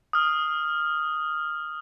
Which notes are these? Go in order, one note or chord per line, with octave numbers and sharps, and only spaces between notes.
D#6 F6